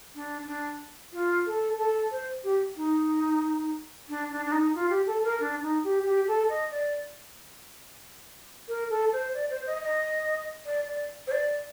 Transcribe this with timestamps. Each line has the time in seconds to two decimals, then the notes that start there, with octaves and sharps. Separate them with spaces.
0.14 D4
0.46 D4
1.12 F4
1.46 A4
1.77 A4
2.11 C5
2.43 G4
2.76 D#4
4.09 D4
4.30 D4
4.45 D4
4.51 D#4
4.74 F4
4.89 G4
5.06 A4
5.24 A#4
5.39 D4
5.62 D#4
5.83 G4
6.05 G4
6.27 A4
6.48 D#5
6.70 D5
8.68 A#4
8.89 A4
9.12 C5
9.34 D5
9.50 C5
9.66 D#5
9.83 D#5
10.65 D5
10.87 D5
11.27 C5
11.31 D5